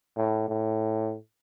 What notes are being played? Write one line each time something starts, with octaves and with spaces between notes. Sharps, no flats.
A2
A2